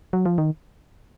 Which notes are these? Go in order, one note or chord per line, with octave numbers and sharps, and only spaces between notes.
F#3
F3
D#3